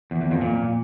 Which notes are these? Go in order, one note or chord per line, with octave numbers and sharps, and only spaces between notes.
E2
E2
F2
A#2